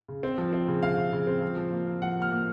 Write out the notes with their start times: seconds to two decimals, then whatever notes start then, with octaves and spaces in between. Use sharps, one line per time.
0.08 C#3
0.23 C4
0.38 F3
0.53 C4
0.68 C#3
0.83 C#3 F5
0.98 C#3
1.13 C#3
1.27 C4
1.42 F3
1.57 F3
1.72 A#3
1.87 A#3
2.02 F3 F#5
2.17 A#3
2.22 F6
2.31 A#3